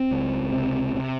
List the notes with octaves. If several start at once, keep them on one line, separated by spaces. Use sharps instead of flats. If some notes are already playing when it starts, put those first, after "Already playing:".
Already playing: C4
C#2
C3
C3